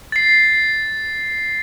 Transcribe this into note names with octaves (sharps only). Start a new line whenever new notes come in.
A6 C7